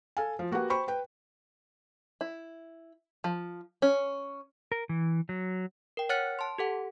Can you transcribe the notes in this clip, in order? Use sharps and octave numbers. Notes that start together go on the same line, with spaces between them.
A4 F5 G#5
F3
A#3 F#4 G4 B4 F#5
C5 G5 B5 C#6
B4 G5
E4
F3
C#4
A#4
E3
F#3
A#4 G5
C#5 F#5 F6 F#6 A6 C#7
A5 C6
G4 A4 F#5